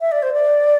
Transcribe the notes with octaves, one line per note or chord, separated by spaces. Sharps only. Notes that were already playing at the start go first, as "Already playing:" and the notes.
E5
D5
C5
D5